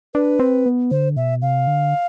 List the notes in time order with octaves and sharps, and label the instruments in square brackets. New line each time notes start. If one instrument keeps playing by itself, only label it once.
[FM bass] D4 [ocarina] B4
[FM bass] C4
B3
[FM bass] D3 [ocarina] C5
[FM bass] B2 [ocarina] E5
[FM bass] C3 [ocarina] F5
[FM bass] D3